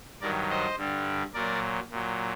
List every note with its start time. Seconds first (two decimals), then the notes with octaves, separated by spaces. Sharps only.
0.21 G2 D#3 F#3 A#4 D5
0.49 C5 D#5
0.77 G2 D3 G3
1.34 A#2 F#3 A#4 D5
1.90 A#2 F#3